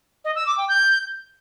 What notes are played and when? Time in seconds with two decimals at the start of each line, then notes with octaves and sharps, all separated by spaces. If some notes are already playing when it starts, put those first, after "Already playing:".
0.25 D#5
0.36 E6
0.47 D6
0.58 G5
0.68 G6